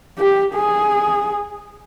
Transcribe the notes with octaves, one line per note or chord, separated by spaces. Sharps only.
G4
G#4